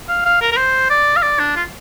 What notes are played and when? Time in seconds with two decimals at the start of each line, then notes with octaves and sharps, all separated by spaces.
0.09 F5
0.25 F5
0.42 A#4
0.52 A#4
0.57 C5
0.90 D5
1.16 F5
1.22 D5
1.39 D4
1.56 F4